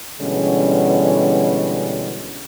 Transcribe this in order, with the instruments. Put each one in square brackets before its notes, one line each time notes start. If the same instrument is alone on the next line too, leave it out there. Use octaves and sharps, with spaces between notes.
[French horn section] B2 D3 E3 G3 G#3 C#4